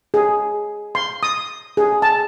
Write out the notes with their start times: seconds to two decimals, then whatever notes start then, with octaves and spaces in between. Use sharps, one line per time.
0.14 G#4
0.95 C6
1.23 D#6
1.77 G#4
2.02 A5